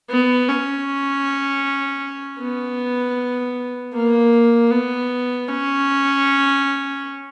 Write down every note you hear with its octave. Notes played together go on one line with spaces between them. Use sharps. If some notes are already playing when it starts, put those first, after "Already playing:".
B3
C#4
B3
A#3
B3
C#4